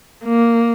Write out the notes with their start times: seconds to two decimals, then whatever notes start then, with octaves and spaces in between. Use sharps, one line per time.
0.24 A#3